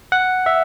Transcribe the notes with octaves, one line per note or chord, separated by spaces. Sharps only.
F#5
E5